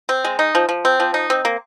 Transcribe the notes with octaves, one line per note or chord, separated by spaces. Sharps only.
C4
G#3
D#4
F3
F3
C4
F3
D#4
C4
A#3